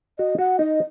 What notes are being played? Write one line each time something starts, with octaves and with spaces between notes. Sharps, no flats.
F#4 D#5
F#4 F#5
D#4 D#5